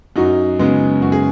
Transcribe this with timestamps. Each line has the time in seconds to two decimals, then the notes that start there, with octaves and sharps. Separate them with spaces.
0.16 F#2 D#4 F#4
0.59 C#3 G#3 B3
1.01 F#2 F#4
1.12 G#4